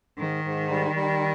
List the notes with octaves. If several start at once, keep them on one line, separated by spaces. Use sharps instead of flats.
G#2 D#3
G#2
G3
G3